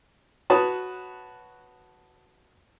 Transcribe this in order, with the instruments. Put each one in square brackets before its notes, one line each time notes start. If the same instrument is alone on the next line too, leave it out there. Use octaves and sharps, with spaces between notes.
[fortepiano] F#4 B4 C#5 A5 D#6